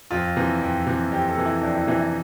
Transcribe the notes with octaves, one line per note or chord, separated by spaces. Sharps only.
F2 F4
C3 E3
F2
C3 E3
F2 G4
A4
C3 E3
E4
F2 D4
E4
C3 E3 E4
E4